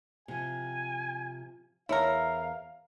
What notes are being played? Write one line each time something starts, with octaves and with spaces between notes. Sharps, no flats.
C3 F3 G#5
E2 E4 A#4 C#5 F5